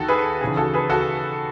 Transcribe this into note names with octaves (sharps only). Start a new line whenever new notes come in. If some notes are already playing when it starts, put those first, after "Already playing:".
Already playing: D#2 D#3 F#4 A4
G#4 B4
D#2 C#3 E3 G#4
F#4 A4
G#4 B4
F#4 A4